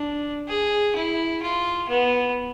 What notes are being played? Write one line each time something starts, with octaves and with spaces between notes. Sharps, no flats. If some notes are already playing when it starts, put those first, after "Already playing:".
Already playing: D4
G#4
E4
F4
B3